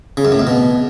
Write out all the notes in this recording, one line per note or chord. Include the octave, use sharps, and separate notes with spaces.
C#3
F#2
A2
F2
B2